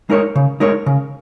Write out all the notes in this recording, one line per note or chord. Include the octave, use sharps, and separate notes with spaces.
G#3 D#4 A#4 C#5
C#3
G#3 D#4 A#4 C#5
C#3